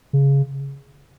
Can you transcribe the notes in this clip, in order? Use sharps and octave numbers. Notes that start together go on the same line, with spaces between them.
C#3